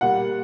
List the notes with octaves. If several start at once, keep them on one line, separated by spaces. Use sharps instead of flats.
A#2 G3 F#5